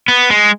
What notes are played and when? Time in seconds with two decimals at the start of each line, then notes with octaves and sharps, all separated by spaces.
0.08 B3
0.30 G#3